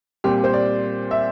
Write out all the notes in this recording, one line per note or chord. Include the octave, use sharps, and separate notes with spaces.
A#2 G3 C4 G4
C5
D5
E5